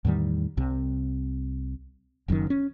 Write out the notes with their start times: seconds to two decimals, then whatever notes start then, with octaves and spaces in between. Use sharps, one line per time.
0.05 E2 A2 D#3 G3
0.57 C2 C3
2.28 F#1 F#2 A#2 D#3
2.50 C#4